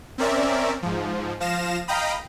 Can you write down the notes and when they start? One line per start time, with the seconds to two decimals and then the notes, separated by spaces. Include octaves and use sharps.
0.18 C4 C#4 A#4 D5 E5
0.83 G#2 F3
1.40 F3 F5 A#6 E7
1.88 D#5 F5 G5 A#5 B5 D#6